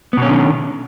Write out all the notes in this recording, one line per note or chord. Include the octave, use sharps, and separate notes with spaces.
B2 D3 D#3 B3 C#4